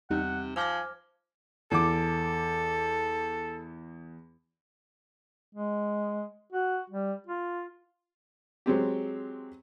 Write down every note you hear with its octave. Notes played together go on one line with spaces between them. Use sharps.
E2 C3 G3 D#4 F#5
F3 C5 G#5 D6 E6 F6 G6 A#6
E2 A4 D6
G#3
F#4
G3
F4
F#3 G#3 C4 G4